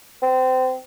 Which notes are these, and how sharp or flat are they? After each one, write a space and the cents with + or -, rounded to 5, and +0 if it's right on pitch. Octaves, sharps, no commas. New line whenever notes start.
C4 -25